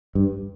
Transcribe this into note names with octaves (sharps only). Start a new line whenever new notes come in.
G2